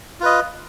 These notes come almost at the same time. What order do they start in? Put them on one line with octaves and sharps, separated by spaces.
F4 B4 D#5